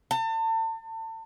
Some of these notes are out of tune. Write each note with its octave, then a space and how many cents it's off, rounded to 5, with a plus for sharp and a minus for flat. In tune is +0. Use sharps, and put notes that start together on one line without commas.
A5 +35